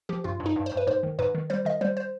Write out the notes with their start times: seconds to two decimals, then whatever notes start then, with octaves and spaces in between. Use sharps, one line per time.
0.09 F3 G4
0.24 G2 F4
0.40 G2
0.46 D#4
0.56 G2
0.66 C5
0.72 G2
0.77 B4
0.87 G#2 C5
1.03 D#3
1.19 G#2 B4
1.35 D#3
1.50 G3 C5
1.65 D#3 D#5
1.81 G3 C5
1.97 C5